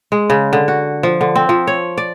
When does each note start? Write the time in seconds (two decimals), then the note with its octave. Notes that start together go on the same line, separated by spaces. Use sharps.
0.12 G#3
0.30 C#3
0.53 D3
0.68 F#4
1.03 F3
1.21 D3
1.36 C4
1.49 F3
1.67 C#5
1.98 D5